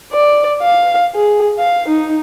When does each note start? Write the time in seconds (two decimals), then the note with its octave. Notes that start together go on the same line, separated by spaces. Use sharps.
0.12 D5
0.62 F5
1.15 G#4
1.59 F5
1.88 D#4